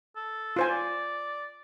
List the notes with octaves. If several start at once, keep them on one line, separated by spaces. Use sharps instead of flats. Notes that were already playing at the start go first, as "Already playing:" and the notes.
A4
F4 C5 G#5
D5